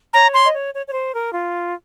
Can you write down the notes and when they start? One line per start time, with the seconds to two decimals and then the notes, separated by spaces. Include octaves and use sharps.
0.14 C#5 A#5
0.34 C6
0.44 D#5
0.53 C#5
0.73 C#5
0.86 C#5
0.93 C5
1.14 A#4
1.33 F4